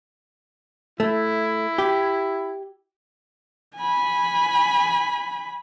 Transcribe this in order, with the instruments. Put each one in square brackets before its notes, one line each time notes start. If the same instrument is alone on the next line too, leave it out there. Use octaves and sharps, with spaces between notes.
[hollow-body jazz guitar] A3 [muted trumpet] E4
[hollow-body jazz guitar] G4
[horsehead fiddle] G#5 B5